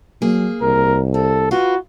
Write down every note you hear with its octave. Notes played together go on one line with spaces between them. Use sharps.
F#3 A#3 G#4
C2 A#4
C4 A4
F4 F#4 B4